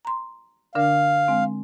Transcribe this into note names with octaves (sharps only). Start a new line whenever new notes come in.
A#5 C6
D3 D4 A#4 F5
G#3 C4